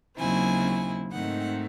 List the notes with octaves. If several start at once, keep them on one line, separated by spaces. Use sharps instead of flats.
D#2 C#3 F#3 C4 E4 G#5
G#2 D#3 A3 C4 D#4 F#5